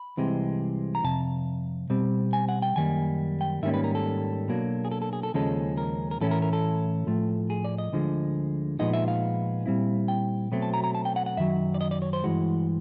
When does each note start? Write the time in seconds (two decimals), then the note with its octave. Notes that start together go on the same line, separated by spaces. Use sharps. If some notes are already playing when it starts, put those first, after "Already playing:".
Already playing: B5
0.17 C2 C3 E3 G#3 C4
0.95 A#5
1.04 F2 C3 A5
1.90 B2 G3 C4
2.33 G#5
2.49 F#5
2.62 G5
2.76 F#2 D#3 G3 A#3 G#5
3.41 G5
3.62 G#2 D#3 G3 A#3 C#4 E5
3.74 B4
3.84 A#4
3.95 A4
4.48 B2 F#3 A#3 D4
4.85 G#4
4.91 A4
5.02 A4
5.13 G#4
5.23 A4
5.34 D#2 C#3 F3 G#3 C#4 A4
5.78 A#4
6.11 A#4
6.21 A2 E3 A3 C#4 E4 A4
6.31 A#4
6.42 A#4
6.53 A4
7.07 A2 F3 A3
7.50 G#4
7.64 D5
7.78 D#5
7.92 D2 D3 F3 G#3
8.79 A#2 F3 G#3 B3 D#4 D#5
8.93 E5
9.08 F5
9.66 A#2 G3 C4 E4
10.08 G5
10.52 B2 F#3 A3 C4
10.62 A5
10.74 A#5
10.84 A#5
10.95 A5
11.05 G5
11.16 F#5
11.26 F#5
11.37 F#2 D#3 F#3 E5
11.74 D5
11.81 D#5
11.91 D5
12.02 C#5
12.13 C5
12.24 G2 E3 G#3 F#4